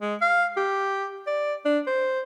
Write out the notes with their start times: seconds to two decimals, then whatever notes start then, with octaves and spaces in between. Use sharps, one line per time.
0.01 G#3
0.21 F5
0.57 G4
1.27 D5
1.65 D4
1.87 C5